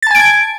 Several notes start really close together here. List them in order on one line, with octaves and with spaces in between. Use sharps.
A6 A5 G#5 D7 G#6